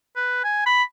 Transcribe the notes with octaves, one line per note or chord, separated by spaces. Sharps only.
B4
G#5
B5